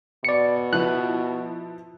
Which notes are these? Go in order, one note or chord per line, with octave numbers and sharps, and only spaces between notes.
B2 D5 C#7
F3 E4 B4 F#6